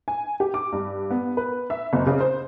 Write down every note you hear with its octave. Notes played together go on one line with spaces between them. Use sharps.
G#5
G4
D6
G2
B3
B4
E5
F#1
C#3
C5